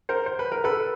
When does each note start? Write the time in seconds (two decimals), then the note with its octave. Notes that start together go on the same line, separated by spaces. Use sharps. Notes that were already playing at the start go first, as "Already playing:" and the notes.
0.09 A#4 C5
0.26 C5
0.39 B4
0.52 A#4
0.64 A4 B4